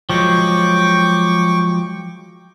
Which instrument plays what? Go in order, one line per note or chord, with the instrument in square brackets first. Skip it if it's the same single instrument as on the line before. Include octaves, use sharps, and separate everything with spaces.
[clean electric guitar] F3 F#3 G#3 [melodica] G5 C#6 D6